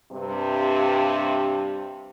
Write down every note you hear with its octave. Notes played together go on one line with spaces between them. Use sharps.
G2 C3